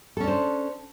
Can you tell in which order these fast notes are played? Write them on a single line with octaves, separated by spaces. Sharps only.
A4 C#4 D4 C5